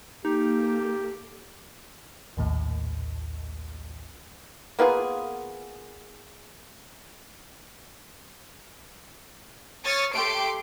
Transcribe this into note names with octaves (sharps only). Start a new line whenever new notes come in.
A#3 D#4 G4 A4
A#1 D#2 A2
A#3 B3 F4 G#4
C#5 D#6 F6 A6
A3 G4 C6 D7